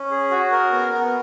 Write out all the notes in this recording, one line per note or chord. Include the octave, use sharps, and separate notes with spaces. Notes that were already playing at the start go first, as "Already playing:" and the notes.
Already playing: C#4
G#4
F#4
A#4
B3
B3